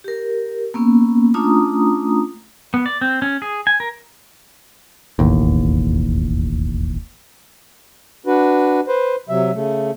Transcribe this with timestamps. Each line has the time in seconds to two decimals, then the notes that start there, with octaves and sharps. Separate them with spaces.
0.04 G4 A#4
0.74 A#3 B3 C#4
1.34 A3 C#4 D4 F4 A#5 D#6
2.74 B3
2.86 D5
3.01 C4
3.22 C#4
3.42 G#4
3.67 G#5
3.80 A#4
5.19 E1 A1 D#2
8.26 D4 F#4 B4
8.88 B4 C5
9.29 C3 F#3 E5
9.53 C#3 A3